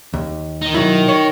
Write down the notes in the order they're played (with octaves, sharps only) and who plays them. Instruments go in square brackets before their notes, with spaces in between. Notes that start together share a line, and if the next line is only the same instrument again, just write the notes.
[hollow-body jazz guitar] D#2
[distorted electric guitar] D#3 D#4
[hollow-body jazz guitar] B2 F#3 E4
C#5